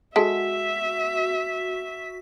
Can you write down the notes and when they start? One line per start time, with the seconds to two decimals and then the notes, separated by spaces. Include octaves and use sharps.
0.16 G#3 F#4 A4 E5 B6